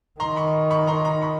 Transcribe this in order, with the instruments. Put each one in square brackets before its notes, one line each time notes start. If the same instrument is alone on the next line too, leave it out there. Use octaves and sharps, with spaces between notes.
[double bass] D#3 [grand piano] A#5 C6
[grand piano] B5 C#6
B5 C#6
A#5 C6
A#5 C6
B5 C#6